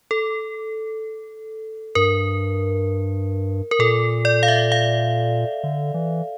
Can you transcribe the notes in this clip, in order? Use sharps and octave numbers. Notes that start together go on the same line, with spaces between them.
A4
G2 A#4
A#4
A#2 A4
D5
F5
E5
F5
D3
E3